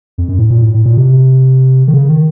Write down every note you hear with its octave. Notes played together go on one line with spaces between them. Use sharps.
F2
F#2
A2
A#2
A2
A2
A#2
C3
D#3
C#3
D#3